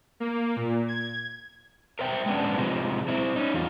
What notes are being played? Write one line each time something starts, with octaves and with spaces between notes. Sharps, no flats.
A#3
A#2
G#6
A#4 C5 E5 G5
G#3 B3 C#4 D4
C3 F3 G#3
C4 E4
C#4 D#4
E2 F4